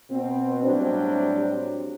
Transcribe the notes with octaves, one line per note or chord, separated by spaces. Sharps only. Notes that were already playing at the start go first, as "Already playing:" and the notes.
B2 C4
A2 F#3 G3 C4 D4 G4